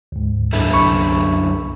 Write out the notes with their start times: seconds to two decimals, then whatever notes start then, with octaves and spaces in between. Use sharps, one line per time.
0.12 D2 G#2
0.53 F#2 D3 E4
0.73 C2 B5 C#6